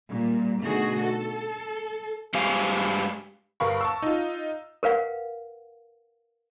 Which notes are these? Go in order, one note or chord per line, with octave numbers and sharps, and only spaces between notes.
A#2 G3
B2 D3 A3 D#4 F#4 G#4
A4
G2 G#3 G4 F5 G#5
G1 A#4 F5 B5 C#6
A5 C#6 E6
D#4 F4
A#4 B4 F5 F#5